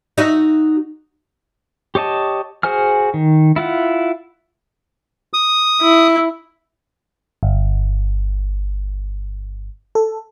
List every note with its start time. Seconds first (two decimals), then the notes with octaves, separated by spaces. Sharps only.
0.18 D#4 F#4 E5
1.95 G4 C#5 D#5 A5
2.63 F#4 G#4 C5 G#5 F6
3.14 D#3
3.56 E4 F4 F#5
5.33 D#6
5.82 E4
7.43 G1
9.95 A4